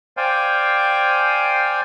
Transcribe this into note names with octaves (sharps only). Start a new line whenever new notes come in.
C5 D5 F5 G5 G#5